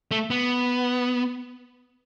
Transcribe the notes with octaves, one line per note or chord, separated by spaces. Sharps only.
A3
B3